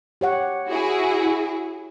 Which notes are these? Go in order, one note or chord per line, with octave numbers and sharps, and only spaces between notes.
G4 C#5 F#5
E4 F#4 G#4